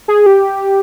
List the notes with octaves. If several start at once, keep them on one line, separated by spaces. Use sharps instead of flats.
G#4
G4